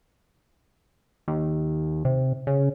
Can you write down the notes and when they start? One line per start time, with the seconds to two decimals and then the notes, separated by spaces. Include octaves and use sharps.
1.28 D#2
2.05 C3
2.47 C#3